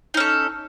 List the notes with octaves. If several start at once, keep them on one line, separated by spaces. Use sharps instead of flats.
C#4 D#4 A4